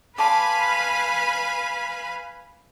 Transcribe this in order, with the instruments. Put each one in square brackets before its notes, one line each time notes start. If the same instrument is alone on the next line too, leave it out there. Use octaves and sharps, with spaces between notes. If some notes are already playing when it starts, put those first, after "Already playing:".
[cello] B4 [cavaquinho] D5 A5 C6 [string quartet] F5 G#5 B5